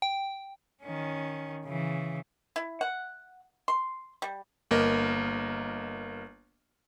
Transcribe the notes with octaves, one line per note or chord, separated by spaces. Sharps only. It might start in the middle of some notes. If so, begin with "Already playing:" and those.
G5
D#3 C#4
C#3 E3
E4
F#5
C6
G3
G1 A#3 A#4 D#5